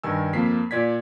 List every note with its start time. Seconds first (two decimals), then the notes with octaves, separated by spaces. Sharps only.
0.03 G2 D#3 G#5 E6
0.33 F2 A#3 B6 C7
0.71 A#2 D5 G#6 B6